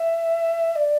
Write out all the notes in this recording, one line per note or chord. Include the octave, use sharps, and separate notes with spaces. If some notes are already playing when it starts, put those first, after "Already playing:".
Already playing: E5
D5